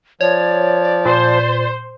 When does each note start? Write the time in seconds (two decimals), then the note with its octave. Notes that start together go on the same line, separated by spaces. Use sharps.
0.21 F3 C#5 D5
1.06 A#2 C5